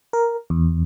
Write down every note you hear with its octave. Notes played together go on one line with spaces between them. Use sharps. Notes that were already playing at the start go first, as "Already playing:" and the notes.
A#4
E2